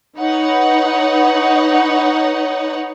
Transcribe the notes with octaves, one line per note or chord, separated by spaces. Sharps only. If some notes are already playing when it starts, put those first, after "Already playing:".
D#4 B4 C#5 F#5